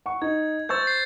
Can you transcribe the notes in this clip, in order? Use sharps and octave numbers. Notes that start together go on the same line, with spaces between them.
F#5 C#6
D#4 G#6
C5 C#6 E6 G6 A6
G6 C7